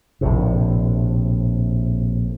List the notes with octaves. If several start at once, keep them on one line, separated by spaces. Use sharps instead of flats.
A#1 A2 C3